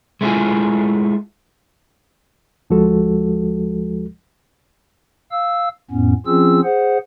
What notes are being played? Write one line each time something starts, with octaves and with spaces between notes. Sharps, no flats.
G#3 A3 C#4 E4 F4 G#5
D2 F3 G#3 F#4 A4
F5 E6
F2 A2 B3 C#4
F3 C4 C#4 F4 G#4 E6
G#4 C5 F#5